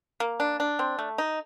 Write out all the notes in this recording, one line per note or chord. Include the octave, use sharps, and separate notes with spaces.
A#3
D4
D4
C4
A3
D#4